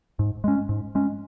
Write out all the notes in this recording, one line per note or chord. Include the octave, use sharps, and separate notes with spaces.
G#2
G#3 C#4
G#2
G#3 C#4